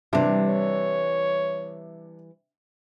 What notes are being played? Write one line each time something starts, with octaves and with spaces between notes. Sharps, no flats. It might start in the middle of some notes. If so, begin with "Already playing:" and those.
C3 E3 G3 D4
C#5